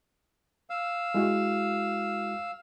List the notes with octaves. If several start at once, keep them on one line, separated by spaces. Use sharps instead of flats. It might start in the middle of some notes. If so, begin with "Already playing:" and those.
F5 E6
G#3 E4 F#4